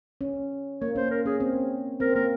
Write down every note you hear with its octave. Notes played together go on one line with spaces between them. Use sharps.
C#4
A#3 C#5
C#4 C5
A#4
C#4 G#4
C4
C4 A#4
A#3 A#4